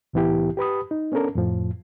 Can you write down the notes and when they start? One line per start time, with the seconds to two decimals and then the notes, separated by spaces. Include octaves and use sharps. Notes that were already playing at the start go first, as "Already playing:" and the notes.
0.13 C2 A2 E3 B3 E4 G4
0.57 G4 B4 B5 D#6
0.91 D#4
1.12 B3 C#4 D4 A4 A#4
1.35 F2 A2 F3